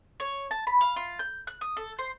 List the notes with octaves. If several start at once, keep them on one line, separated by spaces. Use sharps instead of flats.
C#5
A5
B5
F5
F4
G6
F#6
D#6
A4
C5